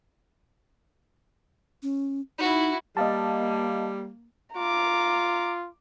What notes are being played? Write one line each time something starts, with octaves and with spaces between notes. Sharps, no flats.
C#4
D#4 E4 F#4
G3 A#3 D#5 F5 A5
F4 A#5 D6